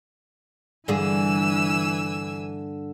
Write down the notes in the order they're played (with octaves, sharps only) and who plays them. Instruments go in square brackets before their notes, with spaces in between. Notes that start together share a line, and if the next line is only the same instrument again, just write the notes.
[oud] G2 D3 G#4 [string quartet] E3 G#5 E6